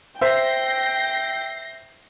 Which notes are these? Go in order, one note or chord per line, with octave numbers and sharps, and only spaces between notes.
C5 E5 G5 G6 A#6 C7